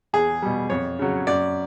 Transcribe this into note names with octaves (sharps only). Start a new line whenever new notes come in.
E2 G#4
B2 G3
F2 C#5
C#3 F#3
F#2 D5